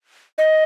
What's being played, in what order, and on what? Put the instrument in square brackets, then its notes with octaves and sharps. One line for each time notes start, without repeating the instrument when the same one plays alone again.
[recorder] D#5